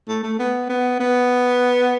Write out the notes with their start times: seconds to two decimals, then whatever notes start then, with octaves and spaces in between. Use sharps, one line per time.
0.08 A3
0.23 A3
0.39 B3
0.69 B3
1.00 B3